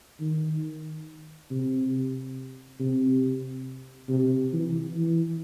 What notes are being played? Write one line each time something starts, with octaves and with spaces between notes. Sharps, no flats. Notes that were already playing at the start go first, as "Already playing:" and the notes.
D#3
C3
C3
C3
E3
E3